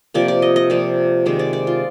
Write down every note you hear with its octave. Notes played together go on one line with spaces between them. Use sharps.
C3 F3 A#3 D5
D5
D#5
D#5
C3 F3 A#3 D5
C3 D#3 G#3 D5
D5
D5
F4